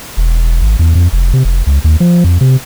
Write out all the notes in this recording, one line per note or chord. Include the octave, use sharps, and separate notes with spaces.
E1
G#1
E2
F2
F1
C3
F1
C#2
D#2
F3
F2
C3